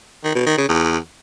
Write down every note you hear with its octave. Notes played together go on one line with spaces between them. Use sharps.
D#3
B2
D#3
C#3
E2